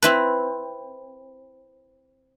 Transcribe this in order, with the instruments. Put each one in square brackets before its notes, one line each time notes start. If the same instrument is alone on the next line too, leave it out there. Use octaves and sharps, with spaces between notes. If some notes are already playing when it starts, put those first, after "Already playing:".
[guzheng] C4 E4 B4